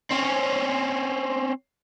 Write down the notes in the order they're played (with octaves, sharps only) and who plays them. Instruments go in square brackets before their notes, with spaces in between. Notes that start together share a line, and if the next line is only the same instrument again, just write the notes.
[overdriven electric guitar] C4 C#4